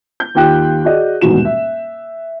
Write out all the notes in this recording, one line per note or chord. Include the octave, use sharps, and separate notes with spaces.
G6
D#2 F4 G4 G5 F#6
F#4 G#4 D5 D#5
D#1 E2 G#2 B2 F#4 E7
E5